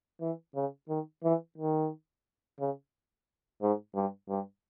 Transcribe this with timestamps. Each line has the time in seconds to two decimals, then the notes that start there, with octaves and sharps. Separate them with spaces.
0.21 E3
0.55 C#3
0.89 D#3
1.24 E3
1.58 D#3
2.59 C#3
3.62 G#2
3.95 G2
4.29 G2